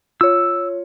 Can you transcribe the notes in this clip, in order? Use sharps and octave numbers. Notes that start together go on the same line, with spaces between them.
F4 C#5 E6